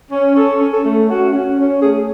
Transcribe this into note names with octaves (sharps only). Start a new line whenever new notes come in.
C#4
C#4 A4
C#4
A4
A3
C#4 F#4
C#4
C#4
A3 G#4